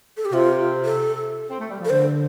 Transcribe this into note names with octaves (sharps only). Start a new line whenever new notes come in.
A4
G4
C3 F4
A4
C4
A3
G3
F3 A4
D3 C5